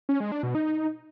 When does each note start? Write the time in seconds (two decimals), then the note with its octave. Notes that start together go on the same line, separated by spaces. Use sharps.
0.09 C#4
0.20 G#3
0.32 D4
0.43 B2
0.55 D#4